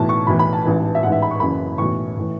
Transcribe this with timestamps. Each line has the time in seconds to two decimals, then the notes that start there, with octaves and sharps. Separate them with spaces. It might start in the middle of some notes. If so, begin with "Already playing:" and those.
Already playing: B1 A2 E3 A5
0.09 C#6
0.27 B1 A2 E3 B5
0.39 B5
0.53 A5
0.65 A1 G#2 E3
0.95 E5
1.03 A1 G#2 E3 F#5
1.12 E5
1.22 B5
1.31 C#6
1.40 F#1 F#2 C#3 E3 B5
1.78 B1 A2 E3 C#6
2.17 A2 E3